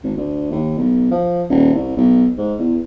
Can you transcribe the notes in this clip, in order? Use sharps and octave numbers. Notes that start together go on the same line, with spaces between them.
G#1
D2
D#2
B1
F3
D#1
C2
B1
G#2
E2